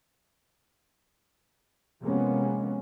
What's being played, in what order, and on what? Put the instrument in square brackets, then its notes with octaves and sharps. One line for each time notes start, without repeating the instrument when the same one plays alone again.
[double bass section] C3 F3 G#3 A#3 B3 C#4